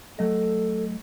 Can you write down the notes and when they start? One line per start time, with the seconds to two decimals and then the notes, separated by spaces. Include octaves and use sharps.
0.19 F#3 A3 A4 D#5